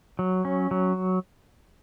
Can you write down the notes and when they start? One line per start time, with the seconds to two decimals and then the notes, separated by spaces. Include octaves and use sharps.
0.19 F#3
0.45 C#4
0.71 F#3